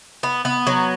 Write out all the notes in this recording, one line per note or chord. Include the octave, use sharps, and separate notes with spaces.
B3
B3
F#3